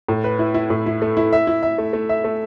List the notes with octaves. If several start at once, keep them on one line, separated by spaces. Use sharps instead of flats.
A2
B4
E4
E4
A2
E4
A3
E4
E5
E4
E5
A3
A3
E5
A3